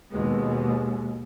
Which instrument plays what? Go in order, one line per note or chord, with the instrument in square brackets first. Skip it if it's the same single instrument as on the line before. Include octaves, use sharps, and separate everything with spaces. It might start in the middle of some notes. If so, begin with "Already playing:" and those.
[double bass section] D#2 B2 G#3